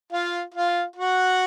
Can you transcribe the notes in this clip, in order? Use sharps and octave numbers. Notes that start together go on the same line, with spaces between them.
F4 F5
F4 F5
F#4 F#5